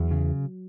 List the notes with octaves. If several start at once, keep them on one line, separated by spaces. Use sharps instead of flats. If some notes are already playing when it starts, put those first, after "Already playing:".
Already playing: E2 F#3
C#3